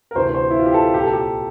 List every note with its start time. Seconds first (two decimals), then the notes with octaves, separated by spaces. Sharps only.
0.11 A#4
0.15 D2 C3 E3 C5
0.34 C5
0.51 E4
0.59 F4
0.66 G4
0.74 A4
0.93 C2 A#2 G4
1.03 A4
1.13 G4